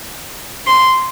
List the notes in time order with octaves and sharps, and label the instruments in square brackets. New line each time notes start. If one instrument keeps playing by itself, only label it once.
[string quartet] C6